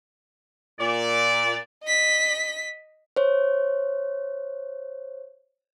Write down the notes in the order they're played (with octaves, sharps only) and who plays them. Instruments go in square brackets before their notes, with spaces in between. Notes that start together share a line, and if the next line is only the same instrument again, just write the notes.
[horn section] A#2 D5
[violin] D#5 B6
[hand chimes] C5 C#5